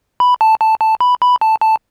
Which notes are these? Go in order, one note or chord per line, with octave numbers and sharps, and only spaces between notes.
B5
A5
A5
A5
B5
B5
A5
A5